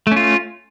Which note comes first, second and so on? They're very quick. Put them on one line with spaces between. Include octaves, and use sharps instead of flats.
A3 C#4 F4